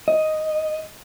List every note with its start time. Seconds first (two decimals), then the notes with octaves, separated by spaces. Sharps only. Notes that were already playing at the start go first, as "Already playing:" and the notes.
0.08 D#5